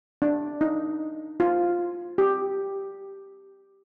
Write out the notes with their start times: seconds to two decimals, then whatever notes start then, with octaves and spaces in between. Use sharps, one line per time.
0.22 D4
0.61 D#4
1.40 F4
2.18 G4